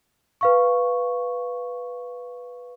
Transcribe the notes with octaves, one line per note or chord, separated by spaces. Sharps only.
B4 F5 C#6